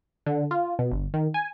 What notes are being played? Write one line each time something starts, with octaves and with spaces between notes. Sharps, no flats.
D3
F4
B2
G1
D#3
G#5